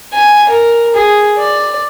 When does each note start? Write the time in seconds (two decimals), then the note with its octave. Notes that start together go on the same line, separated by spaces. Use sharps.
0.13 G#5
0.49 A#4
0.95 G#4
1.38 D5